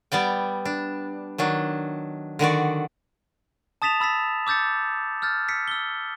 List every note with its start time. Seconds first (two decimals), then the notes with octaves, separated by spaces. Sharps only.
0.12 G3 B3 D5 G5
0.65 D4
1.38 D#3 F#3 D4
2.39 D3 D#3 F#4 D5
3.82 A5 D#6 A6 B6 E7 F7
4.00 B5 E6 A6 B6
4.47 D6 E6 G6 A6 C#7
5.22 E6 F6 G6 A6
5.48 E6 B6 C#7
5.68 E6 G7